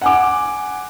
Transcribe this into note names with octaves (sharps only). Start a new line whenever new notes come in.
F#5 G#5 D6